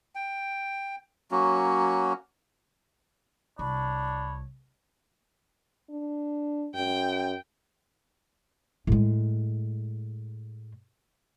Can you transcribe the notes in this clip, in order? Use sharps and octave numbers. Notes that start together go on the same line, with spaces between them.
G5
F#3 A#3 C#4 F#4
C2 D4 C#5 B5
D4
F#2 G5
A2 G#3